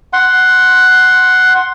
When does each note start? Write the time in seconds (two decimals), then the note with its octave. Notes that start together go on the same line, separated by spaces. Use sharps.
0.13 F#5 C6